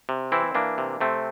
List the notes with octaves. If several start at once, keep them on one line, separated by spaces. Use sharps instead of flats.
C3
E3 C4 E4
E3 A#3 D4
C3
C3 A3 C4